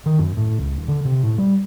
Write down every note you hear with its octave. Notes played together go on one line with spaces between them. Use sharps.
D#3
F#2
A2
C#2
D#1
D3
C3
A2
G3